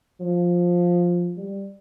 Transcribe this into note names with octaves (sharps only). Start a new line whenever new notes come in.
F3
G3